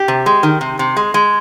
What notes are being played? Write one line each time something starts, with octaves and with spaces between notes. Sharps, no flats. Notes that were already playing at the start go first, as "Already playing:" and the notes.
Already playing: G4
C3
G#3
D#3
C3
C3
G#3
G#3